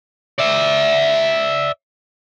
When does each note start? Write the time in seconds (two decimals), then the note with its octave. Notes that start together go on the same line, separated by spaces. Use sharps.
0.39 D5 E5